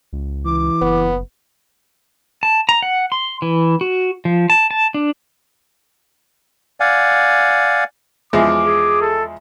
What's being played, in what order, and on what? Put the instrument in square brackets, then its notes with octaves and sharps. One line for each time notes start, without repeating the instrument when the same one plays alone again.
[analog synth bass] C#2
[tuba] E3 [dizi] D6
[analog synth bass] F#1 [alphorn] B3
[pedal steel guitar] A5
A#5
F#5
C6
E3
F#4
F3
A5
A5
D4
[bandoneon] D5 F5 F#5 G#5
[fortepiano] E2 F3 G#3 [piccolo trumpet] D6
[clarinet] G#4
[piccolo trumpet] A4